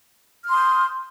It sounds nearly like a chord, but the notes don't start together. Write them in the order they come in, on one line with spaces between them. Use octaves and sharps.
F6 C6 D#6 G6